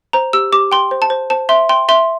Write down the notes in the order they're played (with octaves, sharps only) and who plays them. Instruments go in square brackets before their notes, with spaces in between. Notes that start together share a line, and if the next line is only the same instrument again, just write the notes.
[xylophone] C5 A#5
G4 E6
G4 D6
G5 C6
C5
A5
C5
C5 A5
E5 C6
G5 C6
E5 C6